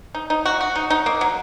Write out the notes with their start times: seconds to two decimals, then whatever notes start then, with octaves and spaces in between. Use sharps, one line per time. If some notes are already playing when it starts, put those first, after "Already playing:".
0.15 D#4
0.30 D#4
0.45 F#4
0.61 F#4
0.76 D#4
0.90 D#4
1.06 A#3
1.21 F#3